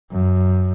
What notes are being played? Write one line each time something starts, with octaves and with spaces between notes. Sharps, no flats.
F#2